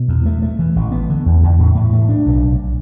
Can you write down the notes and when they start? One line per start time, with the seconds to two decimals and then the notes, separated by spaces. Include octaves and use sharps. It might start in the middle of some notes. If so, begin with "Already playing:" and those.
Already playing: B2
0.08 E2
0.26 A3
0.42 A3
0.59 E3
0.76 A1
0.92 B3
1.09 D3
1.26 E2
1.43 E2
1.59 A2
1.75 A2
1.93 A3
2.09 D4
2.26 B1
2.42 B1